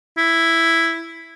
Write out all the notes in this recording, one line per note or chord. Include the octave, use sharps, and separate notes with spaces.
E4